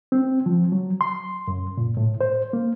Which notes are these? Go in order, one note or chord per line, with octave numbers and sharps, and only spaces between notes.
C4
F3
F#3
C6
F#2
A#2
A2
C5
A#3